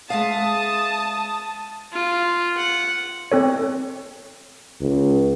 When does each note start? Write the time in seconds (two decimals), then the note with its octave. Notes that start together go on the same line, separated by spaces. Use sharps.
0.10 G#3 E5 F5 A5 D#6
1.93 F4
2.57 F#5
3.32 C4 A4 C#5
4.81 C#2